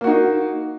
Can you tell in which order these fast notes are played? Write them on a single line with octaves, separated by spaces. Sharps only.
A#3 F#4 D#4